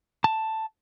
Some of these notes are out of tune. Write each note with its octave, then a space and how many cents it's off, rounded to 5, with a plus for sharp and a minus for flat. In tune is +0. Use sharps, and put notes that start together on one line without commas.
A5 +5